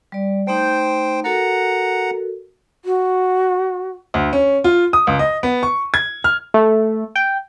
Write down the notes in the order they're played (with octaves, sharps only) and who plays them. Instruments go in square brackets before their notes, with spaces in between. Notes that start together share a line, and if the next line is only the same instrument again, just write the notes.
[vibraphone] G3 D5
[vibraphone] A3 D#4 [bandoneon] C5 G5
[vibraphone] F#4 A4 A#4 [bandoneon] F#5 A#5
[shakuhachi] F#4
[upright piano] D2
C#4
F4
D#6
C#2
D#5
B3
C#6
G#6
F6
[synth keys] A3
G5